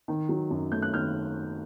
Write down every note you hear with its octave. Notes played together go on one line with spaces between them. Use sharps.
D#3
F#3
F#2
A3 G6
F#6
D#3 F6 G6